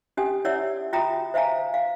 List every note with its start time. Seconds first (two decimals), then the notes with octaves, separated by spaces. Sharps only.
0.17 C#4 G4 G#5 D#6
0.45 E4 C#5 D5 E5 F#5 E6
0.93 F4 F#4 E5 G5 A#5 D#6
1.34 C5 E5 F5 G#5 A#5
1.74 F5